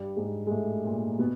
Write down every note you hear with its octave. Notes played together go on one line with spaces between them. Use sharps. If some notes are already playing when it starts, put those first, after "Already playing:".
Already playing: G2 G3
G#2 G#3
G#3
A2 A3
A#2 A#3
B2 B3